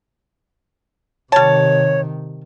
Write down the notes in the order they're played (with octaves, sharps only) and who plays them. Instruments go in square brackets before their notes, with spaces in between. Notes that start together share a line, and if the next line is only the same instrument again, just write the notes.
[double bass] C3 D#3 [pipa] G3 A5 [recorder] C#5